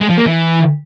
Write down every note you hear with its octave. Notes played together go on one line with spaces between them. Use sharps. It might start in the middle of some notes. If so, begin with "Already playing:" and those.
G#3
F3
A#3
E3